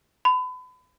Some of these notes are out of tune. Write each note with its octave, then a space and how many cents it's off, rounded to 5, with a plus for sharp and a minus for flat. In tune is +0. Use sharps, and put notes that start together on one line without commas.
B5 +35